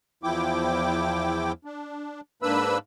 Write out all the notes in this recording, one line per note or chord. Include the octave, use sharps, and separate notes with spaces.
E2 F3 E4 G5 D6
D4
G#2 A#3 D4 B4 B5 E6